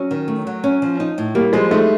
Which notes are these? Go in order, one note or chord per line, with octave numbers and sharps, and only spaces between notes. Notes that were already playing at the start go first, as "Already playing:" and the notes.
Already playing: F#3 C#4
D#3
A3
F#3
C#4
F3
D#4
A2
G3 A#3
F3 G#3
A3 D#4